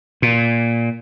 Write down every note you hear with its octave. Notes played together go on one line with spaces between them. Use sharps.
A#2